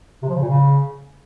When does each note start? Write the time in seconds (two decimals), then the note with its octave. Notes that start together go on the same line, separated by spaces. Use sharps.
0.22 C3
0.29 F3
0.35 C#3
0.42 A#2
0.48 C#3